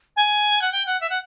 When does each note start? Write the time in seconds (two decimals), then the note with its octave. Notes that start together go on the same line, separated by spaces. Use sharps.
0.16 G#5
0.62 F#5
0.72 G5
0.87 F#5
1.01 E5
1.10 F#5